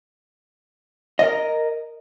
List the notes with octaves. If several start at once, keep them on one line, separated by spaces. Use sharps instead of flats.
A#4 D#5